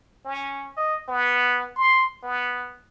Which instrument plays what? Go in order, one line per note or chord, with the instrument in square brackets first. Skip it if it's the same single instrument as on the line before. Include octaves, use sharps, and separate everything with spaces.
[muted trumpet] C#4
D#5
B3
C6
B3